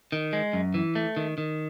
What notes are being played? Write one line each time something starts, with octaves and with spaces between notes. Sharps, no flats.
D#3
G#3
F#2
E3
A3
D#3
D#3